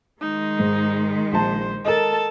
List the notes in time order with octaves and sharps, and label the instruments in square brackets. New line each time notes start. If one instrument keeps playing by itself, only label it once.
[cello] D#3 G#3 [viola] D#4
[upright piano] G#2
[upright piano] A#1 A5 [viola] C5
[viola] A4 A5 [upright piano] A#4 D#5